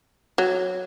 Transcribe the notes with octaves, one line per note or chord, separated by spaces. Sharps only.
F#3